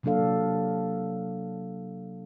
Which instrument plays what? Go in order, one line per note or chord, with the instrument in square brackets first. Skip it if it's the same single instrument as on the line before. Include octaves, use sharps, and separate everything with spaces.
[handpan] C3 F#3 A#3 D4 A4 F5